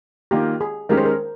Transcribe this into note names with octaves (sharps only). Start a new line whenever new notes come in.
D#3 A#3 F4 G4
G#4
D#3 G#3 C#4 G4 A#4
C5
A#4